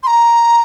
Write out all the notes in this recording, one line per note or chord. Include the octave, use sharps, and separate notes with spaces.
C6
A#5